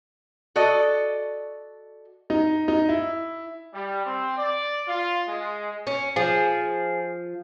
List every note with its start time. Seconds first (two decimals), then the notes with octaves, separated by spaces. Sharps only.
0.56 F#4 A4 D5 D#5
2.30 D#4
2.68 D#4
2.89 E4
3.73 G3
4.05 C4
4.37 D5
4.88 F4
5.28 G#3
5.87 C#4
6.16 F3 G#4